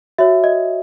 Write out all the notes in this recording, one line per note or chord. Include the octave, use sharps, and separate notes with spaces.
F#4 C#5 E5
D#5